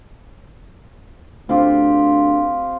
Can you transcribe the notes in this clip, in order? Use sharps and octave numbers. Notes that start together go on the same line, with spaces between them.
D2 C4 F4 G4